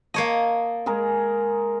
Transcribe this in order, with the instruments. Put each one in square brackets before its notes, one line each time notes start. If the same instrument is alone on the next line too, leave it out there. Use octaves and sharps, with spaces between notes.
[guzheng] A#3 C#5 D#5 [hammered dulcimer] A5
[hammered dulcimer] G#3 G#4 A#4